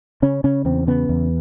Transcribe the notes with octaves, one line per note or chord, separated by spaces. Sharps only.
C#3 C#4
C#3 C#4
E2 C4
C#3 B3
E2